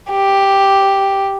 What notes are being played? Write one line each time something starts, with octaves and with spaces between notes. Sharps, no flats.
G4